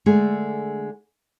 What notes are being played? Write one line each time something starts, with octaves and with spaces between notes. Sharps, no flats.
D3 G#3 A3 G#4